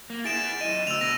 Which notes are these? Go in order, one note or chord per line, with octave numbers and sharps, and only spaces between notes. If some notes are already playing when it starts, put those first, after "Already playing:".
A#3
E4 G#4 A6 D7 E7
F#2 D#5 D#7
D2 E6 F7
B2 A#6 D#7